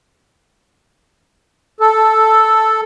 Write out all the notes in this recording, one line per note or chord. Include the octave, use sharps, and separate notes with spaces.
A4